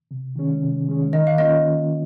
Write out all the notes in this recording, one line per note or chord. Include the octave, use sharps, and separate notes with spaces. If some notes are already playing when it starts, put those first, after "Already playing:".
C3
D#3 G#3 C#4
C3
D#3 G#3 C#4
D#3 D#5
F5
A#3 C#4 F4 D#5